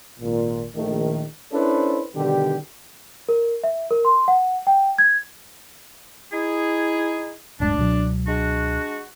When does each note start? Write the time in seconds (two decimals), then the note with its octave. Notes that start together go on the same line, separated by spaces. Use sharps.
0.20 G#1 A#2
0.75 A#1 D#3 A3
1.52 C#4 D4 E4 A4 B4 C5
2.15 B2 D3 D#3 G3 G4
3.29 A#4
3.64 E5
3.91 A#4
4.05 C6
4.28 F#5
4.67 G5
4.98 G#6
6.32 D#4 E4 G#4
7.60 D1 G2 G#3 D4
7.77 C#2 B2 F#3
8.26 G#3 D4 F#4